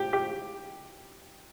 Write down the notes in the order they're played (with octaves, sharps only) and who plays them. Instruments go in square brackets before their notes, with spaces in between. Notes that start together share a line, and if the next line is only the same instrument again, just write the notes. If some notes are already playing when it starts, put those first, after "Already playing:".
Already playing: [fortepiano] G4
G4